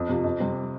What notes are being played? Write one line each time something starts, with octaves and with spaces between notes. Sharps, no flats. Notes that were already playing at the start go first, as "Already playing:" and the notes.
Already playing: F2
C3 F3
F2
C3 G3 C4